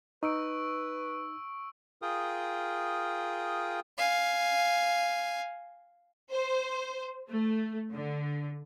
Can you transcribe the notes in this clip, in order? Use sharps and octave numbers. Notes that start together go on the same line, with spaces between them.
D#4 B4 C#6 E6 D7
F4 G#4 A#4 G5 D#6
F5 G#5
C5
A3
D3